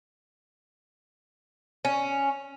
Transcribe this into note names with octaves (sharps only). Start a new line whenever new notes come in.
C#4